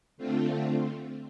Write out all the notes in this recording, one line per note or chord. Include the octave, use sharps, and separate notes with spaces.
D3 A3 C4 F4